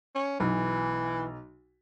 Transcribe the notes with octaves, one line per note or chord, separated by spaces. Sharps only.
C#4
B1 E3